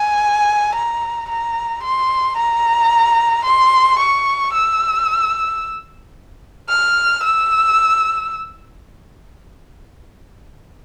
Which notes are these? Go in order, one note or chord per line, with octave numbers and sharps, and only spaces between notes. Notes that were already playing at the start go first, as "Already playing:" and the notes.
Already playing: G#5
A#5
A#5
C6
A#5
C6
C#6
E6
F6
E6